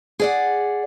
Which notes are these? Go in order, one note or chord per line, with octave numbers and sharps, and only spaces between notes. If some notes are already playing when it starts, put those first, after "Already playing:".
G#4 D5 F#5